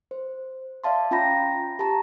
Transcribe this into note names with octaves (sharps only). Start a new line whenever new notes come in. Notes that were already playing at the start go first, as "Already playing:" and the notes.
C5
D5 E5 F5 A5 C6
C#4 F4 G5 A#5 B5 A#6
G4 A5 A#5